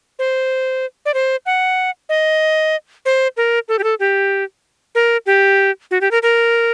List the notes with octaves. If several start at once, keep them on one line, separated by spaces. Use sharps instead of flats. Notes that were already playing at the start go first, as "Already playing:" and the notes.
C5
D5
C5
F#5
D#5
C5
A#4
A4
G4
A4
G4
A#4
G4
F#4
G4
A#4
A#4